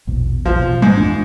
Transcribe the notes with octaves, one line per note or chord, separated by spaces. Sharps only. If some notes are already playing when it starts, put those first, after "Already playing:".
A#1 E2 B2
A#1 E2 F3
B2
G#2 D#3
F2 E3 D4